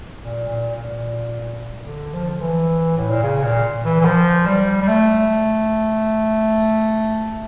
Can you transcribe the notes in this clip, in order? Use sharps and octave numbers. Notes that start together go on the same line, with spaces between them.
A#2
A#2
A#2
D3
F3
F3
E3
A2
A#2
C#3
A#2
E3
E3
F3
G3
G3
A3